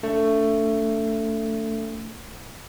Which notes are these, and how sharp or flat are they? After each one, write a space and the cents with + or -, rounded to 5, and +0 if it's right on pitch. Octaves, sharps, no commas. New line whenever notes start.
A3 +15 D4 -35